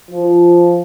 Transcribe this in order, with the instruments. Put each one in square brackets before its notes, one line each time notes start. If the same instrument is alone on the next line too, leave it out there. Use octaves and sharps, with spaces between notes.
[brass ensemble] F3